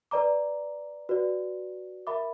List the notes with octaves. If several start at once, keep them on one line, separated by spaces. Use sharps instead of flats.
B4 D5 A#5 D6
F#4 B4 D5
A#4 E5 B5 D6